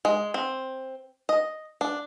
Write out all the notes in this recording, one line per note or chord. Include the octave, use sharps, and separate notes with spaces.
G#3
C4
D#5
D4